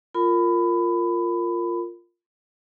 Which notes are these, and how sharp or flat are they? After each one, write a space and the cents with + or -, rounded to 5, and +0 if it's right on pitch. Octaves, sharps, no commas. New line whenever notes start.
F4 +0 A#4 -15 B5 +20